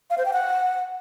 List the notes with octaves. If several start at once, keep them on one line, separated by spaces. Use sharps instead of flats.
F5
C5
G5
F#5